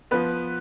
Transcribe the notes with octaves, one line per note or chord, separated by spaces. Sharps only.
F3 B3 B4